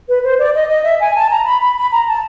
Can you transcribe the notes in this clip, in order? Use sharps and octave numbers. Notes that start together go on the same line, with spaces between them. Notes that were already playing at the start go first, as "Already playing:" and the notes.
B4
C5
D5
D#5
D#5
E5
G#5
A5
A#5
B5
B5
B5
A#5
A5